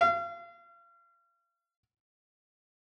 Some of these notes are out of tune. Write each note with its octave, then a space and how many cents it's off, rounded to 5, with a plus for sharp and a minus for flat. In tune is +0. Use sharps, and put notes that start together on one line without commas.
F5 -35